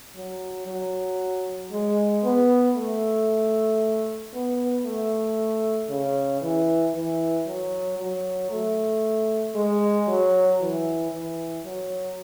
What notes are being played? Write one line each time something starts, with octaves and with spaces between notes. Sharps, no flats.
F#3
F#3
G#3
B3
A3
B3
A3
C#3
E3
E3
F#3
F#3
A3
G#3
F#3
E3
E3
F#3